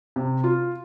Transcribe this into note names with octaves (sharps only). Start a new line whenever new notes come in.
C3
F4